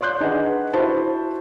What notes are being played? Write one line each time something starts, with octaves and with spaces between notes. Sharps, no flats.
C#5 D5 C6 F#6 G6
D4 D#4 G#4 B4 D#5 F#5
E4 F#4 C5 A5